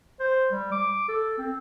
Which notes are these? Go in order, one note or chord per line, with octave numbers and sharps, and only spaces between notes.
C5
G3
D6
A4
C4